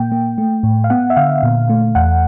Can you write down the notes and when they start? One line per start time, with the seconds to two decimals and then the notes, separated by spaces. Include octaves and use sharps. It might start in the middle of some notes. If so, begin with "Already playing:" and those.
Already playing: A#2 A#3 G5
0.12 A#3
0.38 A3
0.63 A2
0.84 F5
0.90 B3 F#5
1.10 E5
1.17 D3 F5
1.43 A#2
1.69 A3
1.95 E2 F#5